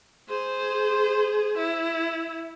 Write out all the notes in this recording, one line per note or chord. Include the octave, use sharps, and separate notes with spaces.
G#4 C5
E4